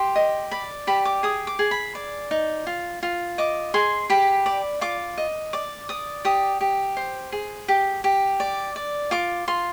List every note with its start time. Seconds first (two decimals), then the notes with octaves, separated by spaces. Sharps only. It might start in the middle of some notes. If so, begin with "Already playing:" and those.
Already playing: G4 C6
0.16 D#5
0.51 D5 B5
0.87 G4 B5
1.05 D6
1.23 G#4 D#6
1.47 D6
1.59 G#4
1.71 B5
1.95 D5
2.31 D#4
2.67 F4
3.03 F4
3.38 D#5 D6
3.74 G#4 C6
4.10 G4 B5
4.46 D5
4.81 F4 D6
5.18 D#5
5.53 D5 D6
5.89 D5 D#6
6.25 G4 D#6
6.61 G4
6.97 C5
7.32 G#4
7.68 G4
8.04 G4
8.40 D5
8.76 D5
9.11 F4 D6
9.48 F4 C6